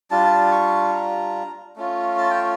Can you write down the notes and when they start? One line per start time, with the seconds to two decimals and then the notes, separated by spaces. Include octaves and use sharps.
0.11 G3 D4 F4 A5
0.52 C#6
0.94 A#5
1.76 A3 C#4 F4
2.18 A5
2.30 G5